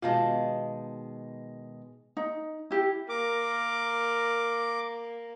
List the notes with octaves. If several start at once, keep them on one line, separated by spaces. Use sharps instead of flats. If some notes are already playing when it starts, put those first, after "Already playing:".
B2 D#3 G#3 F4 F5 A5
D#4
E4 G4
A#3 A#4 D6